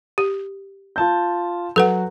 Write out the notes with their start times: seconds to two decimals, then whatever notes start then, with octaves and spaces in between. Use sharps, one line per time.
0.18 G4
0.96 F4 A5 G6
1.76 F#3 F#4 A4 B4 F#5